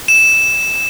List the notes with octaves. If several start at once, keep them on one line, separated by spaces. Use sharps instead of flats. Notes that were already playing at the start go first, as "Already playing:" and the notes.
E7